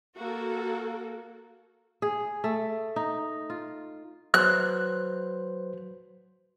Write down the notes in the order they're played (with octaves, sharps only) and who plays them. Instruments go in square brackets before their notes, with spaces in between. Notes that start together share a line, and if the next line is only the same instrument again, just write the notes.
[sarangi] A#3 [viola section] F#4 A4
[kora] G#4
A3
D#4
F4
[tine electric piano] F#3 B4 C5 [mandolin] F#6